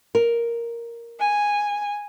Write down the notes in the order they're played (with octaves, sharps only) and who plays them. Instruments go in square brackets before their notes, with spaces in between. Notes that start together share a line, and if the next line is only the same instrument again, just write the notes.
[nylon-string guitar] A#4
[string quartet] G#5